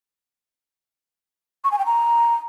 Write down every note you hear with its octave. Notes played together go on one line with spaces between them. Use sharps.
C#6
G#5
G5
A#5